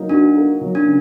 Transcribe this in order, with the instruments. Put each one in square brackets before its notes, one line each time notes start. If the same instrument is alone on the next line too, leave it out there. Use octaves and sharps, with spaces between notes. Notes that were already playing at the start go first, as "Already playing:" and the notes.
Already playing: [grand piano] F#3 A#3 D#4
[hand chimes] D4 [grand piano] F#4
[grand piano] A#3
F#3
[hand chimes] D4
[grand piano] C#3